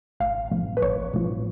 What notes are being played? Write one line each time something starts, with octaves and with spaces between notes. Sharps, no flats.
A1 F5
A2 F3
B4
A1 C#5
A2 F3